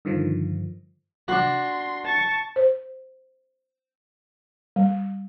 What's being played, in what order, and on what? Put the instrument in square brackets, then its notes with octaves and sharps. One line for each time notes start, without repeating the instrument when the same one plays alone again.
[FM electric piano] G2 D3 D#3 F3
[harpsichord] D4 F#4 [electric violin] C6
[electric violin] A5 C#6
[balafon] C5
G3